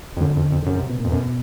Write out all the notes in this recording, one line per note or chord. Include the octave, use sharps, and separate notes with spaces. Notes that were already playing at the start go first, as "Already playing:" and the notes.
F2
F#2 D3
F2
F2
D3
F#2 C#3
C3
B2
F2 A#2
F#2 B2